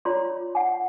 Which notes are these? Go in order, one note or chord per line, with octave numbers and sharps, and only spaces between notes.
F4 C#5 D5 A#5 C6
F#5 G#5